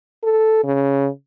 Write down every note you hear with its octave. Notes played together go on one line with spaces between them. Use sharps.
A4
C#3